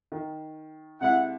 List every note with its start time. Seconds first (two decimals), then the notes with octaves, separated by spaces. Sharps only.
0.12 D#3
1.01 C3 G#3 E4 F#5